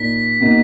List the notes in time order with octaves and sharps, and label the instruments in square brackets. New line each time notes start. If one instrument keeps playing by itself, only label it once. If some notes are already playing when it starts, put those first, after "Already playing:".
Already playing: [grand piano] A#2 A#3 D#4 [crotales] B6
[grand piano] B2 A#3 D#4